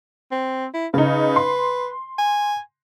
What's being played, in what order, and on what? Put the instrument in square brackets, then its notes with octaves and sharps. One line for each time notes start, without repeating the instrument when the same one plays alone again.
[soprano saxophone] C4
E4
[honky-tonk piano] C#3 D#4 [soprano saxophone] B4
[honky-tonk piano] C6
[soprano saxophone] G#5